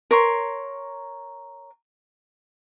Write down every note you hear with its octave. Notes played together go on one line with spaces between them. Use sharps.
A#4 C#5 C6